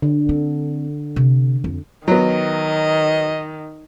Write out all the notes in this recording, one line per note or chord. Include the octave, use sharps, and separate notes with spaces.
D3
C4
C3
F2
D#3 F#3 B3 D#5